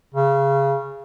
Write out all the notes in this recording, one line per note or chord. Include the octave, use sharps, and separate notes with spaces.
C#3